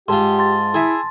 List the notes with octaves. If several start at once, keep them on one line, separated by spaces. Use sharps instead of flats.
G#2 F4 G4 A5 C6
C6 A6
E4 G#4 E5